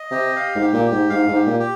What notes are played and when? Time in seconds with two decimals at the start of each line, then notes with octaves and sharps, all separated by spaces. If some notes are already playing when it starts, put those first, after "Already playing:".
Already playing: D#5
0.11 C3 G4
0.36 F5
0.55 G#2
0.61 G4
0.73 A#2
0.85 G4
0.92 G#2
1.10 G#2 F5
1.28 G#2
1.35 G4
1.47 A#2
1.60 G4